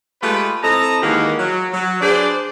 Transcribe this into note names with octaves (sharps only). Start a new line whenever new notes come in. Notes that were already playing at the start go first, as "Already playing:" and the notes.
G#3 A3 F4 G4 B4
C4 E4 A4 D#5 A5 A#5
D#3 E3 G#3 A#3 F#4 G4
F#3
F#3
D4 G#4 B4 C5 D5